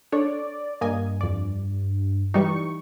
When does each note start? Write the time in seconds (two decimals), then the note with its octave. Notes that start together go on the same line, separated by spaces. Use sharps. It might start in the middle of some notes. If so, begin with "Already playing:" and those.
0.12 D4 A4 C#5 D5
0.81 G2 A#3 D#5 G#5
1.21 F2 D5
2.34 E3 G3 D#4 C#6